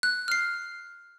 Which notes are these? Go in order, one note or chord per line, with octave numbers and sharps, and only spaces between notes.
F#6
F6 C7